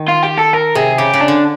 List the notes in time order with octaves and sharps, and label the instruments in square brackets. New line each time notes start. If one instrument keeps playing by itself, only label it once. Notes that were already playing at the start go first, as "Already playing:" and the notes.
Already playing: [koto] D#3
[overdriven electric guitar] F4
G4
A4
A#4
[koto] C3 [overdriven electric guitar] G#4
[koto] C#3 [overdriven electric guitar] G4
[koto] C#3
[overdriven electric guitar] D4
[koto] D3